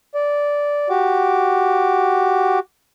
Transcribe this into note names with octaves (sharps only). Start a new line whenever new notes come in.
D5
F#4 G4 D6